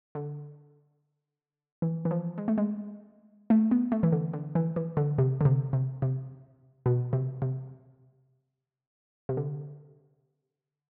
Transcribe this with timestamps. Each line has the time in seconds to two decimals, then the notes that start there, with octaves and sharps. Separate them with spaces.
0.15 D3
1.82 E3
2.05 E3
2.11 F3
2.38 G#3
2.48 A3
2.58 G#3
3.50 A3
3.71 B3
3.92 A3
4.03 E3
4.12 D3
4.33 D3
4.55 E3
4.76 E3
4.97 D3
5.18 C3
5.41 D3
5.45 C3
5.73 C3
6.02 C3
6.86 B2
7.13 C3
7.42 C3
9.29 C3
9.37 D3